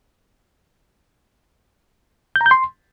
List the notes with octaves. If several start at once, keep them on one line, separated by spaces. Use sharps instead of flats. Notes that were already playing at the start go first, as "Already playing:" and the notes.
G6
A#5
G6
C6